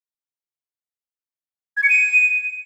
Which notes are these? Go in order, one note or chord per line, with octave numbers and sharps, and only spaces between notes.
G#6
C#7
D#7